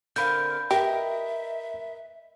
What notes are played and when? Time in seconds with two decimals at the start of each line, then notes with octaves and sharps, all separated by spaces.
0.16 D3 C4 A#4 F5 B5 G6
0.71 G4 A#4 B4 D#5 E5